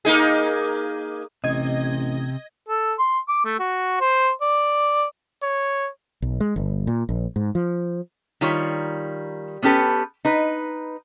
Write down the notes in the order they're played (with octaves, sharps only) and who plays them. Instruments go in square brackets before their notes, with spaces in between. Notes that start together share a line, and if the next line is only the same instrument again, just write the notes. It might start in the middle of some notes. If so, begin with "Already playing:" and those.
[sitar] A#3 D#4 G#4
[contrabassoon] A1 [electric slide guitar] C3 [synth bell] D#5 G#6
[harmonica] A4
C6
D6
A3
F#4
C5
D5
[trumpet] C#5
[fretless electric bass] B1
G#3
G1
A#2
A#1
G#2
F3
[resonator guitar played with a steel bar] D#3 G3 F4 C#5
B3 C#4 G4 A4 B4
D#4 B4